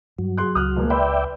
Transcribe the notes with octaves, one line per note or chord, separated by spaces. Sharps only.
G2 F#3
G#4 C6 F#6
C#2 D#6 F6 F#6
E1 A#3
B4 D5 E5 G5 B5 C6